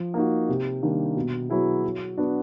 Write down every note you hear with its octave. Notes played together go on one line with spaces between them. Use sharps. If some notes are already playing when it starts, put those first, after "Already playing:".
Already playing: F3
A#3 D#4 F#4
C3
D#3 G3 A#3 D4
B2
F#3 B3 E4 G#4
F#3
B3 D4 F#4